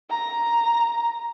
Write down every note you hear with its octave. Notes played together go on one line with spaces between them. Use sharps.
A#5